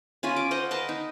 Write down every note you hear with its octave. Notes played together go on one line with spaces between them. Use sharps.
C#4 F4 G#5 B5
D6
C5 D#5 F5 F#5
A#4 B4 D#5 A5
D#4